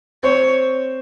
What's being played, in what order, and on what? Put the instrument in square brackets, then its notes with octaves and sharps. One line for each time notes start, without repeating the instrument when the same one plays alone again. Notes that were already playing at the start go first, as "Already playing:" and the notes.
[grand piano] C4 C5 [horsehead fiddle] C#5